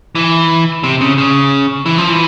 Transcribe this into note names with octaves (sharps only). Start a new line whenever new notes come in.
E3
C3
C#3
C#3
E3
F3
E3